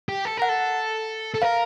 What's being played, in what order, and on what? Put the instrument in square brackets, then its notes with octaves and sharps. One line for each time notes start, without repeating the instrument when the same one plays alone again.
[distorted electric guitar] G4
A4
[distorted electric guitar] A#4 [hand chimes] F#5
[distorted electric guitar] A4
A4
[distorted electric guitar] A#4 [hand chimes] F5